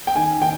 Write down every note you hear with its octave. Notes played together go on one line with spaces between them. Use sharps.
G5
D#3 G#5
D#3 G5